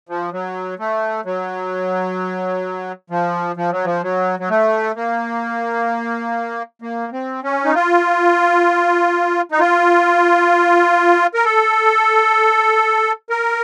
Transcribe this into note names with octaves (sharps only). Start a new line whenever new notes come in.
F3
F#3
A3
F#3
F3
F3
F#3
F3
F#3
F#3
A3
A#3
A#3
C4
C#4
D#4
F4
D#4
F4
A#4
A4
A#4